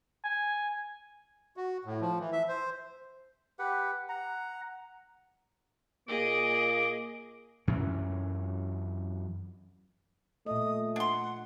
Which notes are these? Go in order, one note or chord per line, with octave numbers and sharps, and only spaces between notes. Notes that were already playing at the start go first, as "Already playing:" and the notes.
G#5
F#4
A2
F3
E3
E5
C5
G4 B4 F#5
F#5 A#5
A#2 A#3 G#4 D#5 D6
F#2 E3 C#4
A#2 A3 D#5 D#6
D4 F#5 C6